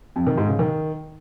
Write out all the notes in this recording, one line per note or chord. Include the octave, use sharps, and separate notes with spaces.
F2
D#3
G#2
C#3
D#3